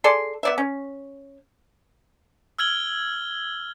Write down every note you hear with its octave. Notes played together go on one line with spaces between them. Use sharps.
G#4 A4 D5 C6
B3 D5 E5
C#4
E6 F6 G#6 F#7 G7